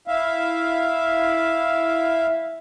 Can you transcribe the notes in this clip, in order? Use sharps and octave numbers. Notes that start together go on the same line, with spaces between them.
E4 E5 F5